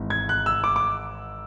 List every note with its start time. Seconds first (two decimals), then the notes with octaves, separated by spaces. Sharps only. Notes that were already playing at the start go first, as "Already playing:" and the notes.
Already playing: G#1 G#2 E3
0.10 G#6
0.29 F#6
0.46 E6
0.64 D6
0.76 D6